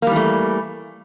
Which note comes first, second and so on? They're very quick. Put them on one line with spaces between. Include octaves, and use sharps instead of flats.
A#3 G3 E3 A3